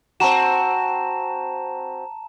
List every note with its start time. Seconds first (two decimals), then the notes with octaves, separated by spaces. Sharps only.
0.20 C4 F#4 A5 A#5 E7